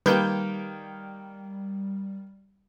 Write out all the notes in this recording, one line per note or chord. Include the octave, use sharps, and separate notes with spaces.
D#3 G3 A#3 G4 B4 G6